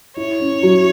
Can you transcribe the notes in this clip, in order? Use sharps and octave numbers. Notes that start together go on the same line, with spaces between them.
E4 C#5
C#4
F#3